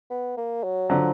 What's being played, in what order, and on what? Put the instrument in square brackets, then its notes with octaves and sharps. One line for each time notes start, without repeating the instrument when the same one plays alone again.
[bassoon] B3
A#3
F#3
[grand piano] D3 F#3 [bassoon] F3